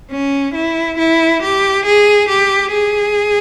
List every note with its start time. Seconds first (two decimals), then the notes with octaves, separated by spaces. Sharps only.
0.11 C#4
0.55 E4
0.98 E4
1.43 G4
1.86 G#4
2.29 G4
2.73 G#4